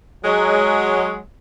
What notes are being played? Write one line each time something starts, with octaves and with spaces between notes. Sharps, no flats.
F#3 G#3